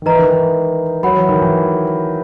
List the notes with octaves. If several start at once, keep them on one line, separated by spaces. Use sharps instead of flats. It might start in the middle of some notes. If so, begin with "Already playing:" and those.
D#3
E3 B4 D#5 A#5
D#3
E3
F#3 C#5 F#5 B5
E3
D#3
E3